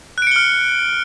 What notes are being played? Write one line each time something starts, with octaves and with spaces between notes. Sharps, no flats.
F6 F#6 C#7 D7 G7